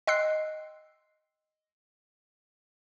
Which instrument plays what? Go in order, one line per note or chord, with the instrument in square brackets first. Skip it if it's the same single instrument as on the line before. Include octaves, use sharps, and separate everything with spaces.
[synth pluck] D#5 G5 C6 E6 F#6 C7